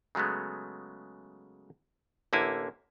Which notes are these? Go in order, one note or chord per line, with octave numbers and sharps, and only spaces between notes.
C#3 F#3 G#3 A3 B3
A1 D3 A#3 E4 G#5